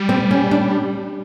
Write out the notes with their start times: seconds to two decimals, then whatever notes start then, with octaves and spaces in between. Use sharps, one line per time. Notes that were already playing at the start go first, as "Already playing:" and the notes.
Already playing: G3
0.09 C4
0.31 C#4
0.51 D4